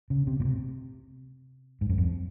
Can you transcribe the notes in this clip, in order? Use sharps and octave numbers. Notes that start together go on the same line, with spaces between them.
C#3
C3
A#2
C3
G#2
F#2
F2